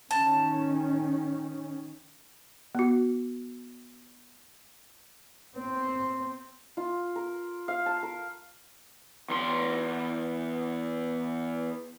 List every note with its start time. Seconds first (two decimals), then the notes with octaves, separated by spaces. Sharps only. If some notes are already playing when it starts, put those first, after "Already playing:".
0.11 D#3 C#4 A5
2.75 B3 F#4
5.58 C4
6.77 F4
7.16 A#4
7.68 F5
7.86 A5
8.03 A#4
9.30 E2 C6